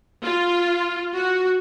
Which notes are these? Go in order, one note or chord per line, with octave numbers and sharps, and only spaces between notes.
F4
F#4